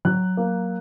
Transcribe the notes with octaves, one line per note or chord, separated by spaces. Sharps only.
F#3 F#6
A#3